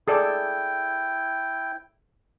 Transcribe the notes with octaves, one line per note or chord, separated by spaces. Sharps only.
E4 G#4 A4 D5 G5